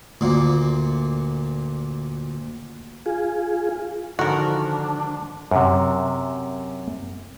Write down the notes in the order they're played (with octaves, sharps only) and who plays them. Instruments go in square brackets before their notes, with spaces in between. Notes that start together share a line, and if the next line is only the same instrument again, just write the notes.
[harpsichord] D2 A#2
[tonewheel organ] F4 G#4
[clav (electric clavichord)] G#2 D#3 F3 [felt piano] D3 [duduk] D4 [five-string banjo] F#4 A#4
[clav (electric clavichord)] F#2 C3